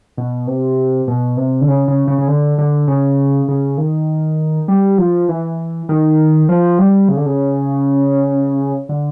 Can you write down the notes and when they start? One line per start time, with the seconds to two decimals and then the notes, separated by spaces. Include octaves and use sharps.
0.17 B2
0.47 C3
1.08 B2
1.37 C3
1.61 D3
1.67 C#3
1.88 C#3
2.07 C#3
2.18 C#3
2.28 D3
2.58 D3
2.87 C#3
3.48 C#3
3.78 D#3
4.68 G3
4.98 F3
5.29 E3
5.89 D#3
6.49 F3
6.79 G3
7.09 C#3
7.17 D3
7.26 C#3
8.89 D3